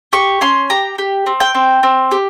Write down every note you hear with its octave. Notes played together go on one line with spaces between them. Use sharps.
G4 C#6
C#4 C6
G4 A#5
G4
C4
G5
C4
C4
G4